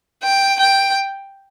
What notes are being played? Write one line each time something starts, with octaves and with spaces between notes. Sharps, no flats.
G5
G5